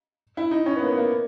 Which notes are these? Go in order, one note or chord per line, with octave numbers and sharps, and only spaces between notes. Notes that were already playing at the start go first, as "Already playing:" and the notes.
E4
D#4
C#4
B3
A#3
B3
A#3